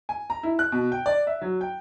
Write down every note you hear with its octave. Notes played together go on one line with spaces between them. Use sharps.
G#5
A#5
E4
F#6
B2
G5
D5
E5
F#3
G5